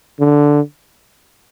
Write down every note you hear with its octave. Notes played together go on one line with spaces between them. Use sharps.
D3